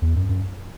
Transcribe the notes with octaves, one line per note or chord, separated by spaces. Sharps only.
E2
F#2
F#2